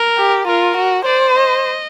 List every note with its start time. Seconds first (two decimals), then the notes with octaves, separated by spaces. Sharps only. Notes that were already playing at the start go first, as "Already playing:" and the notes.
Already playing: A#4
0.18 G4
0.47 F4 A#4
0.77 F#4
1.05 C5 D5
1.35 D#5